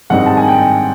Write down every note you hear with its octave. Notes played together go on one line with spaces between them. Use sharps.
G#2 D#3 G3 C4 D#4 F#5
A5
G#5
G5